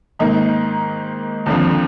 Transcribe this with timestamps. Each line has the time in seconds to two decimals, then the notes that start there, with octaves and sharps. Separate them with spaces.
0.19 G#2 D#3 A#3 D#4
1.46 D#2 D3 F3 C4